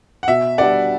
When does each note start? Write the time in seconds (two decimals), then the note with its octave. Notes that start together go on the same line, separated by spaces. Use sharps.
0.23 F#5
0.28 B2 E5
0.58 G3 B3 D4 G4 D5 F#5